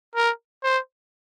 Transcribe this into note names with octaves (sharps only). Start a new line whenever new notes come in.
A#4
C5